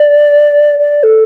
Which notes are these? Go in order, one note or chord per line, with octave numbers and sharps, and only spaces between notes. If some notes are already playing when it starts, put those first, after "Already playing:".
Already playing: D5
D5
A4